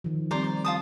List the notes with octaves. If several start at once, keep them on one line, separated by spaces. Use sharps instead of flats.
D#3 F3
G3 C4 C5 D5 A#5
D5
F4 A5 D#6